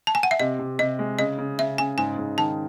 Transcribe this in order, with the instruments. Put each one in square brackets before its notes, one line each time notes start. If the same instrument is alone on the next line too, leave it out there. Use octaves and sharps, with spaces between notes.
[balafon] A5
G#5
F#5
E5
[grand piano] C3 [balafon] D#5
[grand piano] C3
[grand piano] C3 [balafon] D#5
[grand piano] G#3
[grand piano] C#3 [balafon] D#5
[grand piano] C#3
[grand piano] C#3 [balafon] E5
[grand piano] C#3 [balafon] G#5
[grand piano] G#2 [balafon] G#5
[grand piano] G#2
[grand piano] D#3 [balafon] A5